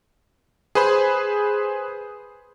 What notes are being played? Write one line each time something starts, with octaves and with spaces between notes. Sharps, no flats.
G#4 B4 C5 B5